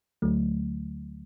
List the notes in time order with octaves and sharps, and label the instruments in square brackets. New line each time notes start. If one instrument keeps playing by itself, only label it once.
[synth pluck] D2 D3 F#3 A3